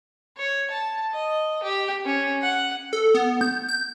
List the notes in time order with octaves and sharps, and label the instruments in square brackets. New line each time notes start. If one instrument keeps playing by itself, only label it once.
[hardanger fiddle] C#5
A5
D#5
G4
C#4
F#5
[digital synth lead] A4
B3
G6
G6